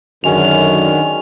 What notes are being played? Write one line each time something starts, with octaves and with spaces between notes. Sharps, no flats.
F#2 D3 D#3 F#3 G#3 C#4 F7